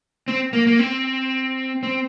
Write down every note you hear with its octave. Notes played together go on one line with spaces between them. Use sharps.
C4
A#3
A#3
C4
C4